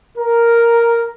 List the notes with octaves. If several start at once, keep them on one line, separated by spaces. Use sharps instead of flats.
A#4